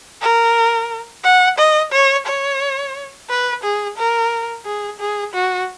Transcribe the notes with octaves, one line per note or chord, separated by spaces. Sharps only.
A#4
F#5
D#5
C#5
C#5
B4
G#4
A#4
G#4
G#4
F#4